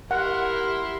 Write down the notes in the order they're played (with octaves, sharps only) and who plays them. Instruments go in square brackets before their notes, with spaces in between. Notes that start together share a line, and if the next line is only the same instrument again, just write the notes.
[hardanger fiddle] E4 C6 [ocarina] G4 [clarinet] A#4 [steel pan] F#5